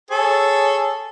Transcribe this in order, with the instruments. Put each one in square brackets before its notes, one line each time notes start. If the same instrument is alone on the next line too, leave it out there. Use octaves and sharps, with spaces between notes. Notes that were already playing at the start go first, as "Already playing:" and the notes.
[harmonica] G#4 A4 C#5